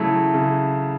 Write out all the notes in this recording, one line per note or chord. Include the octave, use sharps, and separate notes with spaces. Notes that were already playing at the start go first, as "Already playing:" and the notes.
Already playing: C#3 F#3 A3 E4
C#3